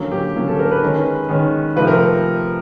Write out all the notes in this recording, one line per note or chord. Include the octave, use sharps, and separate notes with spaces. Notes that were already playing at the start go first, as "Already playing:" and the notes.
Already playing: D3 F#3 A#3 C#4
G4
D3 F#3 A#3 C#4
A4
A#4
B4
D#3 G#3 C#4
D#3 G#3 C#4
C3 F3 A3 C4 B4
A#4